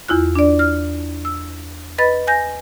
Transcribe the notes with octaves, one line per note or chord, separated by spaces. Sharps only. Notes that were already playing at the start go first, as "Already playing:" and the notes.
E2 E4 F4 F#6
D4 D5
F6
E6
B4 D#5 B5 A6
G#5 G6 A#6